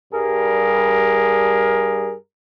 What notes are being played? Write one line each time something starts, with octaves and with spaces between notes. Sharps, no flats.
G2 G3 G#4 A#4